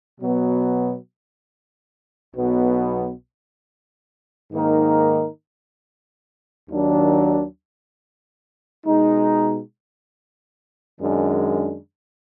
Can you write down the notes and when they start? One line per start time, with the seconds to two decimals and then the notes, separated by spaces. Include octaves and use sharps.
0.20 B2 F#3 B3
2.36 B1 B2 F#3 B3
4.52 G#2 D#3 A#3 D#4 A#4
6.68 D#2 D#3 F#3 D4
8.85 B2 G#3 D#4
11.01 F#2 D#3 G#3 D4